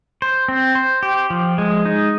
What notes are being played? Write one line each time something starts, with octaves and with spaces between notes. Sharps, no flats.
C5
C4
C5
G4
F3
G#3
D#4